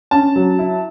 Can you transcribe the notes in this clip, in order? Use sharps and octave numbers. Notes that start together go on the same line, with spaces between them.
C#4 A5
F#3
E4